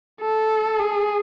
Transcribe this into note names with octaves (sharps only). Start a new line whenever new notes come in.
A4
G#4